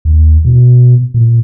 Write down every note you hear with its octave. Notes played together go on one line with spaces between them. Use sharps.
D#2
B2
A#2